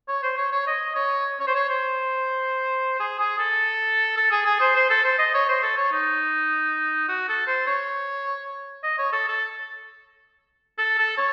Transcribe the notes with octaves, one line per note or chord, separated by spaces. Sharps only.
C#5
C5
C#5
C#5
D#5
C#5
C#5
C5
C#5
C5
G#4
G#4
A4
A4
G#4
G#4
C5
C5
A4
C5
D#5
C#5
C5
A4
C#5
D#4
F#4
A4
C5
C#5
D#5
C#5
A4
A4
A4
A4
C#5